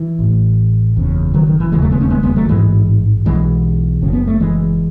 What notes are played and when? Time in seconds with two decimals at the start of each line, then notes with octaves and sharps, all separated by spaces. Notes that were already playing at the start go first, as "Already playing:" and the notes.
Already playing: E3
0.19 A1 A2
0.96 F#1 E2 C#3
1.34 D#3 F#3
1.47 D#3
1.60 E3
1.72 E1 D#2 C#3 E3 G#3
1.82 F#3 A3
1.91 G#3 B3
2.01 A3 C#4
2.10 G#3 B3
2.23 G#3 B3
2.36 F#3 A3
2.49 A1 G#2 E3 G#3
3.25 B1 B2 E3 G#3
4.02 F#1 F#2 C#3
4.13 B3
4.27 A3
4.40 E3 G#3